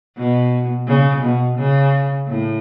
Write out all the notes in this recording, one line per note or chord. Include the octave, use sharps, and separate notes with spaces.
B2
C#3
B2
C#3
A2